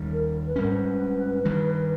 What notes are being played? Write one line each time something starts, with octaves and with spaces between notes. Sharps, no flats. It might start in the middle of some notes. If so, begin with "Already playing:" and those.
Already playing: D#2 D#3 G3
A#4
B4
G#2 G3 C#4 A#4
B4
G2 D#3 G3